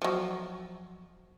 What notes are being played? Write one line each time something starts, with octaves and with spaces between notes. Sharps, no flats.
F3 F#3